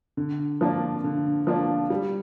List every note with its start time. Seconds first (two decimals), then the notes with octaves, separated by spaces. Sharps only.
0.17 D3
0.61 F3 A#3 D4 F4
1.04 D3
1.47 F3 A#3 D4 F4
1.90 G3